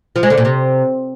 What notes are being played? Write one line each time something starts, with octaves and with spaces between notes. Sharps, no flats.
F3
G#3
D3
A#2
C3